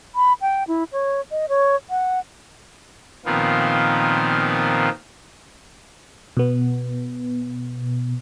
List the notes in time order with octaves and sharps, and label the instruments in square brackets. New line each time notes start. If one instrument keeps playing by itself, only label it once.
[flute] B5
G5
E4
C#5
D#5
C#5
F#5
[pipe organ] A#2 D#3 F3 B3 C4 F4
[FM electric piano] B2 B3